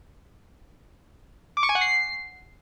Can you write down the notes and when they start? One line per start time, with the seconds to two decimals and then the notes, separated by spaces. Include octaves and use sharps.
1.57 D6
1.63 C#6
1.69 G#5
1.75 F#5
1.81 C7